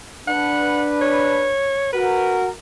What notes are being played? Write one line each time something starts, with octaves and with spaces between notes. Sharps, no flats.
D4 B4 F#5
C#5
F#4 A#4 B4